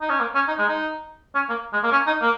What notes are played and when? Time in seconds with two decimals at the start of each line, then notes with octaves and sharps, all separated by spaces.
0.01 D#4
0.10 C#4
0.20 A#3
0.35 C#4
0.48 D#4
0.58 G#3
0.68 D#4
1.35 C#4
1.49 A#3
1.73 G#3
1.83 A#3
1.92 C#4
2.07 D#4
2.22 A#3